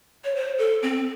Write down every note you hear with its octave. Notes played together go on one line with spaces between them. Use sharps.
C#5
C5
A4
C4